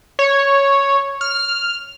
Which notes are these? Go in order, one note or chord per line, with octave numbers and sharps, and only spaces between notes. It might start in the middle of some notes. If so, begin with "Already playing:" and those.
C#5
F6